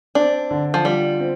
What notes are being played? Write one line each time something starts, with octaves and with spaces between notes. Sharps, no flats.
C4 D4
D3
F3
G3 F4
C4